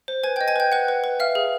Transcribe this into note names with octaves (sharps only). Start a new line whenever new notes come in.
C5
B4 G#5 G#6
D#5 G5 G6
G#5 G#6
B4 G5 G6
B4 F#5 F#6
B4
B4
E5 F5 F6
G#4